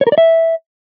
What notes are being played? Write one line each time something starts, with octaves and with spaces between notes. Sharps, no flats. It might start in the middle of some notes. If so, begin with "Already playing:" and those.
C#5
A#4
D5
E5